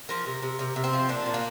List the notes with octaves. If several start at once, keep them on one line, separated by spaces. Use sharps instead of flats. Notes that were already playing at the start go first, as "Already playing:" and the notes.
F3 A#4
C3
C3
C3 A#4
C3
C4
F3
A#2 D4
A#2
A#3